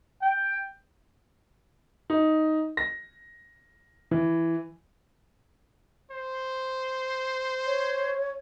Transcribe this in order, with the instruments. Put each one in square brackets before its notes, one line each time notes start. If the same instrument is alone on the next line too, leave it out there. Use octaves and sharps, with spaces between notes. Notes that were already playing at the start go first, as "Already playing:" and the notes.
[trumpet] G5
[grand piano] D#4
A#6
E3
[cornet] C5
[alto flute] C#5